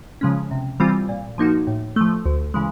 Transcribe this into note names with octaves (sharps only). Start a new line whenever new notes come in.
C#3 F3 G#3 C#4
C3
E3 G3 C4 F4
A#2
F3 A#3 D#4 F#4
A2
F3 A3
D2
C#3 E3 G#3